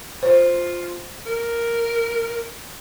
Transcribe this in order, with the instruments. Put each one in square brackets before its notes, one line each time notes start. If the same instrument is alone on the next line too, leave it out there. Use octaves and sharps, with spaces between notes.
[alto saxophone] F4 [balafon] C5
[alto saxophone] A#4